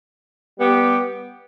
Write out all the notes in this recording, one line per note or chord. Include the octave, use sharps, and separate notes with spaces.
G3 B3 G4